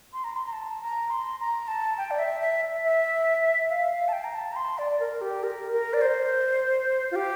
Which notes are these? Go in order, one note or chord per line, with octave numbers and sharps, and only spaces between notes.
C6
A#5
C6
A#5
A5
A#5
C6
A#5
A5
G5
D5
E5
E5
E5
F5
F5
A5
G5
A#5
A5
A#5
C6
D5
A#4
G4
A#4
A#4
D5
C5
F4
G4